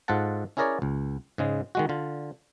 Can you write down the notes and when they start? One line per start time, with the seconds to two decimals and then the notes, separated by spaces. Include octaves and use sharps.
0.08 G#2 F4 A4 F#5 A5
0.57 C#4 E4 G#4 A#4 C#5 D5
0.82 C#2
1.38 G#2 C#3 G#3
1.75 D#3 G#3 F#4
1.89 D3 F4